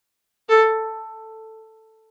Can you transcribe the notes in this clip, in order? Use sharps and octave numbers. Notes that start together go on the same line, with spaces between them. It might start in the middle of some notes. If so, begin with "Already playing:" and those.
A4